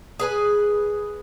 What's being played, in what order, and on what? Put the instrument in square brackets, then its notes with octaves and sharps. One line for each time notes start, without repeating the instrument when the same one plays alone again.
[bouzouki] G#4 B4 G#5